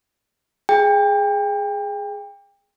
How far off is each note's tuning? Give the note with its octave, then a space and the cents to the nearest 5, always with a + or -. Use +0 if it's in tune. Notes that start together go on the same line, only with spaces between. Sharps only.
G#4 +0 G5 +30